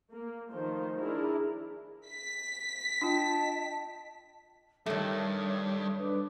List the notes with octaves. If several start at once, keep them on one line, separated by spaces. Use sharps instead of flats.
A#3
D#3 F3 A3 C5
D4 E4 G#4 A#4
B6
D4 F4 D#5 G5 A5
G2 D#3 A3 A4 C#5 D#6
D4 B4 D6